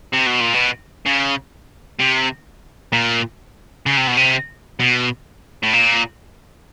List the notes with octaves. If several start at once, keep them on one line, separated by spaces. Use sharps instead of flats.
C3
B2
A#2
B2
C#3
C3
A#2
C#3
C3
B2
C3
B2
A2
A#2